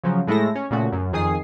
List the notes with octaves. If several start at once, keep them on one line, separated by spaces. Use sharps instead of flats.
C#3 F3 F#3
A2 G#3 A3 E4 A4 A#6
C#4
A#2 C#3 A3 F#4
F#2
F2 D#3 G#4 G#5 D#6 C7